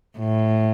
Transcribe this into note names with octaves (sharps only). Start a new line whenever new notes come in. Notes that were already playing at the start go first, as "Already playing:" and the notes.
A2